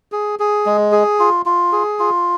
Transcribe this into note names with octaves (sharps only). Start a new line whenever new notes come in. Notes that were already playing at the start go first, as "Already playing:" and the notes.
G#4
G#4
G#3
G#4
F4
F4
G#4
F4